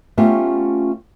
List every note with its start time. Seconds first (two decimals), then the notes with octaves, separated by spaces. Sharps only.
0.17 A3 B3 C#4 F4 G4